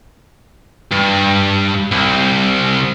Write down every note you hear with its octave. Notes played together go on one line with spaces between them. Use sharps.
G2
C2